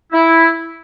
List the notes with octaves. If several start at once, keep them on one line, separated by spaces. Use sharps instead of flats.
E4